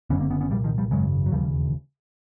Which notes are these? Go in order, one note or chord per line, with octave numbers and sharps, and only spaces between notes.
F#1 F#2 D3 B3 C#4
A#3 C4
B3 C#4
B3 C#4
C2 A#2 F3 G3
D#3 F3
F3 G3
G#1 F#2 C#3 F#3 G#3
F#3
E1 D#2 C#3 F3 G3